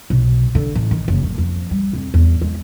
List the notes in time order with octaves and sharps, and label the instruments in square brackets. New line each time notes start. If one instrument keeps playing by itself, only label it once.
[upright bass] B1
D3
A1
D#3
F#1
F#2
F2
G3
F2
E2
G#3